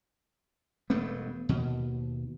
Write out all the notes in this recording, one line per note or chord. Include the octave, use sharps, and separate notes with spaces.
E1 G2 A3 B3
D#2 B2